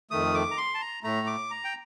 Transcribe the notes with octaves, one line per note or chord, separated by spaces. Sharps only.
F2 D#3 A3 D#6
D6
A#5
C6
A5
A#5
A2 A3 A#5
D6
A#5
G5